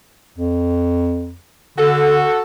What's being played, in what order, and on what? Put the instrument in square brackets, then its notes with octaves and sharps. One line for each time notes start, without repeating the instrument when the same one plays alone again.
[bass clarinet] F2
[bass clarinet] D3 [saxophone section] F#4 A4